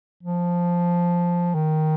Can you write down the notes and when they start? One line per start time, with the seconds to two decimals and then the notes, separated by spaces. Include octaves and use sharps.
0.23 F3
1.54 D#3